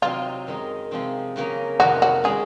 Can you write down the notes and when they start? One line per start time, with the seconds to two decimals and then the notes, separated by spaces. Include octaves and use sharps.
0.02 C3 F#3 C4 D#4 F4
0.47 F#2 D#3 G#3 D#4
0.91 C3 F3 G#3 C4 D#4
1.36 C#3 F#3 A#3 C#4
1.80 F2 C3 D#3 F#3 F#4
2.02 F#4
2.24 D#3 G#3 C#4 G#4